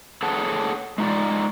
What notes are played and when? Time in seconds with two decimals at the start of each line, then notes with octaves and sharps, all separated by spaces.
0.23 G#4 A4 B4 C#5 F#5 A5
0.98 G#3 D#4 F4 D5